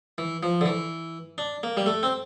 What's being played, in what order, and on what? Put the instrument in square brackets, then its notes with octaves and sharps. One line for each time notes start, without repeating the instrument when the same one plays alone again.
[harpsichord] E3
F3
D3
E3
D4
A#3
G3
A3
C4